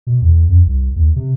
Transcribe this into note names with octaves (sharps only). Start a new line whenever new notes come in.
B2
E2
F2
C2
D#2
C3